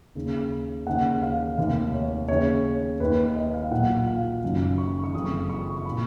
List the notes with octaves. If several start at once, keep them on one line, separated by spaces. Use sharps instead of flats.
D#2 C#3
D#2 C#3 F#5
F5
F1 D#2 D#3 F5
C#5
D#2 C#3 C#5
D#2 D#3 B4
D#5
F5
B1 A#2 F#5
F5
F#1 F#2 D#3
C#6
C#6
F#1 F2 C#3 D#6
C#6
C#6
A#2 B5